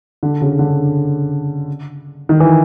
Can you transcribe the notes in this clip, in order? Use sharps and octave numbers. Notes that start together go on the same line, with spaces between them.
D3
C#3
D3
D#3
E3